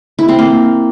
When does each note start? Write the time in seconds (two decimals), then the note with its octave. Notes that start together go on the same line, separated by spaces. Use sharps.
0.19 E4
0.29 C4
0.39 A#3